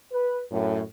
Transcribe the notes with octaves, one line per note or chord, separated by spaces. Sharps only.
B4
F#2 A2